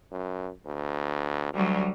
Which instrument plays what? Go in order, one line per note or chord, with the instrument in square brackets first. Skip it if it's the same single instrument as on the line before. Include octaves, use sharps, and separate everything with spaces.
[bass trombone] F#2
D2
[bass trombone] D2 [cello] F#3 G3